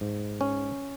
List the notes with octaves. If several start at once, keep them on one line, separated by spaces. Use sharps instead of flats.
G#2
C#4